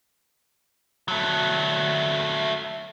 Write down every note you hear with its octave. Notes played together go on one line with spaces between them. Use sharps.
F#3 A3